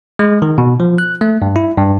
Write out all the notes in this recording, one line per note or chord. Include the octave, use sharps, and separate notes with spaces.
G#3
D#3
B2
F3
F#6
A3
G2
E4
G2